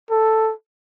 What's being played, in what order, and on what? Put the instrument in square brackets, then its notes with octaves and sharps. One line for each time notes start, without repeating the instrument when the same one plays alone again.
[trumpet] A4